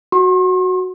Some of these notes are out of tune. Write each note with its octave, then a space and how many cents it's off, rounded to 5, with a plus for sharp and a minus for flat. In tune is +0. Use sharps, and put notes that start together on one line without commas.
F#4 +0 C6 +45